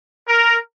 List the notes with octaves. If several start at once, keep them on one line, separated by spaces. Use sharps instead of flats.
A#4